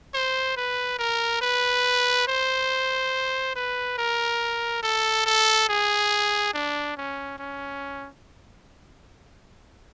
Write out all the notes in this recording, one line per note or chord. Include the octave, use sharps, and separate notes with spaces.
C5
B4
A#4
B4
C5
B4
A#4
A4
A4
G#4
D4
C#4
C#4